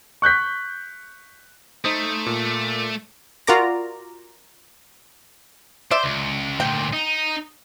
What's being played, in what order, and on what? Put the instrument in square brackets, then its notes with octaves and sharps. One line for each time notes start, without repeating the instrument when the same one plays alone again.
[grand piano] C#6 F#6 G6 B6
[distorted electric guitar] A3 [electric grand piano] D#4 C5 D#6
[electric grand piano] A#2
[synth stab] F4 F#4 A#4 D5 A#5
[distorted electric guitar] C5 [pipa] D5 E5
[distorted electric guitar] C#2
[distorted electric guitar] D2 A#2 [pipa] G5
[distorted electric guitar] D#4